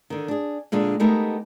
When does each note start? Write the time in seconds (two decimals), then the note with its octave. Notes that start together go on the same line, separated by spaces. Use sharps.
0.10 D3 D#3
0.28 D4 G#4
0.72 A#2 D3 G#3 D4
1.00 G#3 A3 B3 D#4 G4 A#4